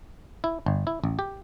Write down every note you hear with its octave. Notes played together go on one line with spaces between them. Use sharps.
E4
G1
E4
A1
G4